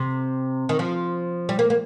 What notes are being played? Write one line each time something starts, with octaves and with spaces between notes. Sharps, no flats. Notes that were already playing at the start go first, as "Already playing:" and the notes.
Already playing: C3
D#3
F3
G3
A#3
A#3